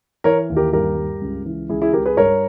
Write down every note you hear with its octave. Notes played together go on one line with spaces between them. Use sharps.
E3 A#4 C#5
D#2
G4 A#4
G2 G4 A#4
G2
C#2
E3
C#2 E4 G#4
E4 G#4
C#2 G4 A#4
G#4 B4
G2 A#4 C#5